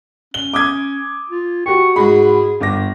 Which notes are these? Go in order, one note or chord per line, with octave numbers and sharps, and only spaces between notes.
C#4 G7
D6 D#6 G#6
F4
F#4 G4 C#6
G#2 F#4 G#4 B5
G1 D6 A#6